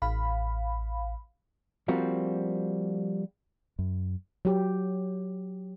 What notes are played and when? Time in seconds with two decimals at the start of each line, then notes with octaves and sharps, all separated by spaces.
0.02 A1 F5 B5
1.88 F3 G3 A#3 C4 F#4
3.79 F#2
4.45 F#3 G4